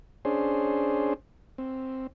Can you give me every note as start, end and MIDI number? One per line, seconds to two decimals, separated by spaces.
0.25 1.14 61
0.25 1.14 62
0.25 1.14 68
0.25 1.14 72
1.58 2.07 60